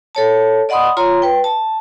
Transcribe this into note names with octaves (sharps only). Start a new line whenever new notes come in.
A4 C#5 A5
D5 D#5 F#5 B5 C6 D#6
F4 C#5 A#5 C6
B4 G5
A5